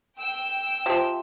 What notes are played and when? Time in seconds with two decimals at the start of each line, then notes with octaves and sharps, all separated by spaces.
0.17 G5 E6
0.86 C3 F3